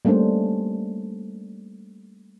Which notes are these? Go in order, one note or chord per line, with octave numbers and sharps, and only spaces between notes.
G3 A3 A#3 C#4 D4 C5